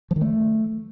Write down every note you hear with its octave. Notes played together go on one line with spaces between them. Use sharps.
F3
D#3
A3